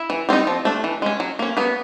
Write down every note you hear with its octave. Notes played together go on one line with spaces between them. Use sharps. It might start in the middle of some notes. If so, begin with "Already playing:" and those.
Already playing: E4 E5
E3
G3 C4 D#4
F3
A3 D4
E3
G#3 C#4
F#3
A#3 C#4
F#3 B3 B4